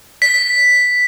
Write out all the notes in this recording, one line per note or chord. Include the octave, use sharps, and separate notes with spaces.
B6